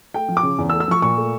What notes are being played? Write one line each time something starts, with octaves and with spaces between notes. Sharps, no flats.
A3 G5
F3
D6
C#3
E2
E6
A3
E6
F3 C#6
A#2 C#6
A3